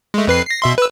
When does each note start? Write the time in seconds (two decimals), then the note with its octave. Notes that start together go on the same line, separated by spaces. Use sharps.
0.14 G#3 A3
0.27 F2 B4 C7
0.47 A#6 C7
0.62 B2 E5 C6
0.78 B4 E6